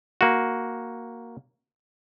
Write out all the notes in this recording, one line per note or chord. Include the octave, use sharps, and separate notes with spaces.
A#3 F#4